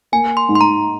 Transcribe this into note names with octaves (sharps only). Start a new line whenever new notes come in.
A#3 G#5
C6
G#2
C6
A#5